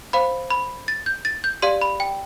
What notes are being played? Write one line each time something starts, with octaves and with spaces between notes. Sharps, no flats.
C5 F5 B5
B5
A6
G6
A6
G6
G4 D5 F5 C6
B5
G5